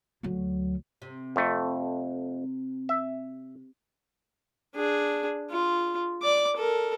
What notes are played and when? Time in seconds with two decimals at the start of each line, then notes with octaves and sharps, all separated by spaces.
0.23 D2 F#3
1.02 C3
1.36 F2 A3
2.89 E5
4.75 D4 G#4
5.50 F4
6.22 D5 D6
6.56 A4 A#4